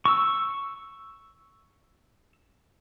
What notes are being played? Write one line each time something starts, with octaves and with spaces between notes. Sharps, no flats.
C#6 E6